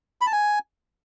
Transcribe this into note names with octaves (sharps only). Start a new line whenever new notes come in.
B5
A5
G#5